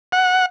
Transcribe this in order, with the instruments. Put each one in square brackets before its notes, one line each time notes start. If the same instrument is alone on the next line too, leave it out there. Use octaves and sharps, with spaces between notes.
[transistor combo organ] F#5